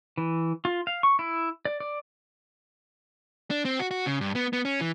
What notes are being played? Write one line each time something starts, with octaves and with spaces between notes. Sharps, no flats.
E3
F4
F5
C#6
E4
D5
D5
D4
C4
F#4
F#4
C#3
G2
B3
B3
C#4
E3